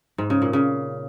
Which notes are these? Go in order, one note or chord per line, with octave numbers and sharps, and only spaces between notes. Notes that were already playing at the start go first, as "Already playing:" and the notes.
G#2
C#3
A#2
C#3